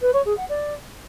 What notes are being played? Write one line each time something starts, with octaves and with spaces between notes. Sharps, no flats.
B4
C#5
G#4
F#5
D5